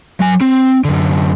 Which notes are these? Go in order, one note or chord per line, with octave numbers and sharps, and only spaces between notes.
F#3 G#5
C4
F#2 D3